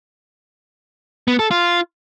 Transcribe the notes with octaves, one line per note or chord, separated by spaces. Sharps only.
B3
A4
F4